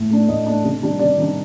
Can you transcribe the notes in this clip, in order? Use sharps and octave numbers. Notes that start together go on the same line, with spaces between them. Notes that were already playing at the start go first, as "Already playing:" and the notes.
Already playing: A2
A3 D4
A2 D#5
A3 D4
C3
D#3 G3 D4
C3 D5
D#3 G3 D4